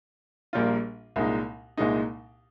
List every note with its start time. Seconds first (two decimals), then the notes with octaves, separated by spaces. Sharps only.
0.53 A#1 A#2 G3 A#3 F4
1.16 C2 A#2 G#3 D#4
1.77 C2 A#2 G#3 D#4